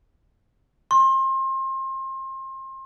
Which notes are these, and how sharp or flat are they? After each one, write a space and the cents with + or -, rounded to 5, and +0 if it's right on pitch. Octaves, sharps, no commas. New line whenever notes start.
C6 +30